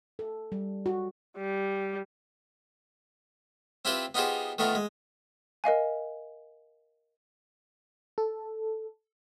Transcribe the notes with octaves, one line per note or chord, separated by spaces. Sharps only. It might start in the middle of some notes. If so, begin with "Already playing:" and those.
A4
G3
F#4
G3
C4 E4 F4 G4 B4 C5
B3 D#4 F4 G4 G#4 C5
D#3 A3 B3 F4 A#4
G#3
A#4 D#5 F5 G#5
A4